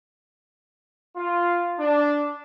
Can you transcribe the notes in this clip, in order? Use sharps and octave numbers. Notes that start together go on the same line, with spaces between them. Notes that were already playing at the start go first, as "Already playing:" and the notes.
F4
D4